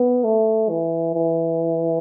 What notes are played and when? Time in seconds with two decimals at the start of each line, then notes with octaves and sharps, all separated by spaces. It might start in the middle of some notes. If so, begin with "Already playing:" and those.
Already playing: B3
0.24 A3
0.70 E3
1.14 E3